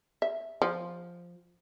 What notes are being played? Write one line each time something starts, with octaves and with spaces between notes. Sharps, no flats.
E5
F3